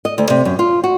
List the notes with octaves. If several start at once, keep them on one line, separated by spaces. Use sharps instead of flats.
D#5
D2
C3
F#2
F4
F#4